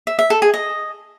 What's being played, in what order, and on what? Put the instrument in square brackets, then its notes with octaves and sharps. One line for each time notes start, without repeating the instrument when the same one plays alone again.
[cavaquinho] E5
E5
A4
G#4
D#5